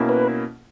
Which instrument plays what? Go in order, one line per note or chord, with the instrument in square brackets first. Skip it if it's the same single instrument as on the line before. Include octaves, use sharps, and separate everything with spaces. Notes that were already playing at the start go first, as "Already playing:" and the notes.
Already playing: [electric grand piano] B2 A#3 C#4 E4
[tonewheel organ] B4